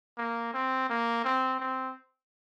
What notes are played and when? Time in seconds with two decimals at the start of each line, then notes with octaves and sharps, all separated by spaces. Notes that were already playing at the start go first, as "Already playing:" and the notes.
0.18 A#3
0.54 C4
0.89 A#3
1.24 C4
1.59 C4